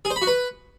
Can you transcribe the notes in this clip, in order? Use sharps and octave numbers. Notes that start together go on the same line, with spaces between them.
G#4
C5
B5
F#4
B4